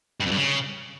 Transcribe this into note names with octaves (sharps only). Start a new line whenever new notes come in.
G2
F2
G2
C#3